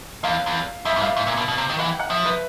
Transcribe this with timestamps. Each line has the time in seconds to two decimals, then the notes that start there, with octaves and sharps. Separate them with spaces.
0.23 E2 F5
0.46 E2
0.85 F2 E5
0.96 G#2
1.01 G2 F5
1.17 G#2
1.27 A#2
1.37 B2
1.48 B2
1.58 C3
1.69 D#3
1.79 E3 F#5
1.89 G5
2.00 F#5
2.10 F3 E5
2.26 B4